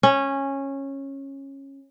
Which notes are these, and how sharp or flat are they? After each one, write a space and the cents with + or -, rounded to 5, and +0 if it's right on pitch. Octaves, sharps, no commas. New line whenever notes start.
C#4 -15